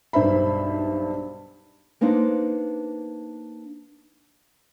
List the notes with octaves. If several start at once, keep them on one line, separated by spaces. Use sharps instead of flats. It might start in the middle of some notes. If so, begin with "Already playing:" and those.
B1 G2 C5 E5 B5
A#3 B3 D4 D#4 C5